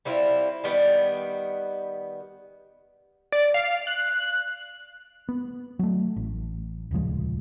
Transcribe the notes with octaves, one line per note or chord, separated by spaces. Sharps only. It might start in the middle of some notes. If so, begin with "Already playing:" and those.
G3 C4 E4 F4
D#3 G3 B3
D5
F5
F#6
B3
F#3 A3
A1
D#1 C#2 F3 G#3